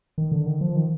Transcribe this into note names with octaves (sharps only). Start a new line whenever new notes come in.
D#3
D3
D#3
F3
D#3